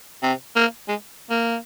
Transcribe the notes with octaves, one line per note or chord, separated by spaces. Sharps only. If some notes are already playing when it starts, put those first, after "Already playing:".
C3
A#3
G#3
A#3